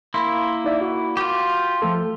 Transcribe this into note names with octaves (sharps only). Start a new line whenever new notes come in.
A#3 E4 B5 C6
D#4 D5 E5
F#4
F4 G4
F3 A3 A4